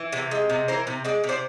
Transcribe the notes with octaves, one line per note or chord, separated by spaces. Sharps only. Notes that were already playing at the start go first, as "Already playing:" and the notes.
Already playing: E3
C3
G#3
C3
E3 A#4 C5
C3
G#3 D5
C3
C5 D5